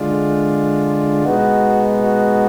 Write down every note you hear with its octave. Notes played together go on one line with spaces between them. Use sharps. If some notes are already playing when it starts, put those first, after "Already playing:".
Already playing: D3 G#3 D4 F4
B2 G#3 B3 D#4 F#4
F#4